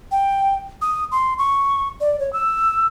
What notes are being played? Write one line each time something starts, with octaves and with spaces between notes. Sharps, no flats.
G5
D#6
C6
C#6
D5
C#5
E6